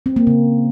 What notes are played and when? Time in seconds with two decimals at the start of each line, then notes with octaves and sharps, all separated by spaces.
0.06 C4
0.16 A#3
0.27 C#3